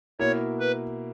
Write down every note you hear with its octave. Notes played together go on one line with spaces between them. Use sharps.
B2 A#3 E4 A#4 C#5
B4